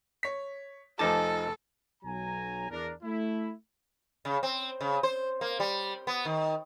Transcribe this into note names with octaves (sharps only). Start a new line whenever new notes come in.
C#5 B6
F1 F3 D#4 A4 G#5 A5 D6
B1 F#3 G#5 A#5
E2 D4 A#4
A3 E4
C#3
C4
C#3
C5
A#3
G3
B3
D#3